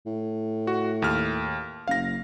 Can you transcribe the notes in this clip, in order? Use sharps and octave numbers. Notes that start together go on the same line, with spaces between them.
A2
F#4
D#2 F6
F#1 F5 A#6